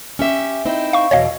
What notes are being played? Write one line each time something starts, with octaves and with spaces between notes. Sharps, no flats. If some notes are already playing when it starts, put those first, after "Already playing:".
C#4 G4 E5
C4 D#4 E4
F5 C#6
E2 B2 F#3 C#5 D#5 F5